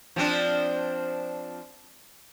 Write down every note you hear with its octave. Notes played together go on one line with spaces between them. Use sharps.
F3 C4 D4